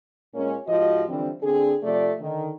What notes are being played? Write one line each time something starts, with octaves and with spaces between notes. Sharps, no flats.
A#2 G#3 A#3 C#4
G#2 F3 F#4 G4 D#5
D3 E3 F3 G3 C4 D4
D3 C4 D4 G#4
C3 F3 A3 D5
D3 D#3